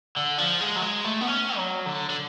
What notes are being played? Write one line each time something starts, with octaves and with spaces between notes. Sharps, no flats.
D3
F3
G#3
F#3
G#3
A3
B3
C#4
F#3
D3
D3